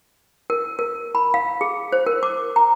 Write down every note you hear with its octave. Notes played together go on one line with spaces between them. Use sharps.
A#4
A#4
B5
F5
G#4
C5
A#4
D6
A#5